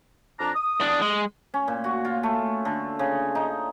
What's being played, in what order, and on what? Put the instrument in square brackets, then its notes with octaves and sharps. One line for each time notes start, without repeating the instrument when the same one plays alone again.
[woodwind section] F2 D4 A#5
D#6
[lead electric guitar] E2 D4
G#3
[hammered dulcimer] C#4
A#2
F#4
F4
A3
D3
C#3
D#4